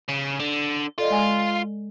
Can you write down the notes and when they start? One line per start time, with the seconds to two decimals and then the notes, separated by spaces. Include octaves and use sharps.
0.08 C#3
0.40 D3
0.98 F4 A4 D5 D#5
1.10 G#3 G#5